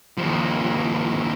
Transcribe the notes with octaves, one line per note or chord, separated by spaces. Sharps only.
D#2 F3